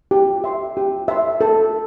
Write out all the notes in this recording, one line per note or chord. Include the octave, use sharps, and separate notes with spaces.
G4
E5 C6
G4
E5 C6
A4